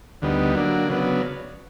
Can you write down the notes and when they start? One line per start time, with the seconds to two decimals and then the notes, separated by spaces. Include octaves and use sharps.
0.22 D2 D3 G3 B3 D#4
0.55 D3 F#3 A#3 D4
0.89 C#3 F#3 B3 D4